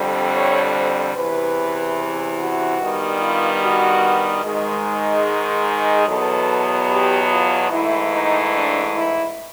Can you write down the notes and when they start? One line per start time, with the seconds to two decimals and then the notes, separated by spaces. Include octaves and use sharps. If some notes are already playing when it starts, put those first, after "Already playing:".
Already playing: F2 D3 G3 C4
0.33 C#5
0.75 C5
1.15 E2 C3 E3 B4
2.38 F#4
2.79 G2 D#3 G3 B3
3.20 F4
3.61 F#4
4.44 G#2 D#3 G#3
5.66 G#4
6.07 E2 B2 F#3 B3 A4
6.90 G4
7.30 F4
7.71 G#2 E3 A3 E4
8.11 D#4
8.53 D4
8.94 E4